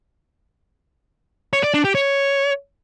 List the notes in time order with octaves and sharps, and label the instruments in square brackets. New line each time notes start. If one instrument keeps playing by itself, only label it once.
[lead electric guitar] C#5
D5
D4
G4
C#5